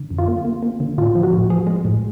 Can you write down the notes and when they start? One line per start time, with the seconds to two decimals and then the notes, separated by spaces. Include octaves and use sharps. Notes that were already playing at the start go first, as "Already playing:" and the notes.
Already playing: D3
0.10 F#2
0.18 F4
0.28 A#3
0.45 A#3
0.63 A#3
0.80 D3
0.98 A2 F4
1.15 F3
1.23 F#4
1.33 A2
1.50 F3 G#4
1.67 G#3
1.85 A2